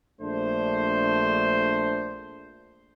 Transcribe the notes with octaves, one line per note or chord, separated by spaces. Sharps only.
A#1 A3 D4 C5